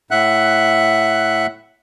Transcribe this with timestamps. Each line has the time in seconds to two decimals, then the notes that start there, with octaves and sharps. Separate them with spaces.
0.11 A2 E5 F#5 F#6